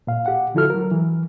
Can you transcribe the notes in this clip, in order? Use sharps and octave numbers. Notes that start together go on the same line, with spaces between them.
A#2 F5
G4 F#5
D3 F3 E4 F#4 A4 F6
F#3 A#4
E3